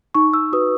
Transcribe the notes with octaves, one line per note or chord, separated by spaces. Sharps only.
D#4 C#6
E6
F#4 B4 D#6